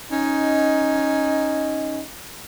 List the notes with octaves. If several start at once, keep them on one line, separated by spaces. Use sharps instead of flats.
C#4 D#4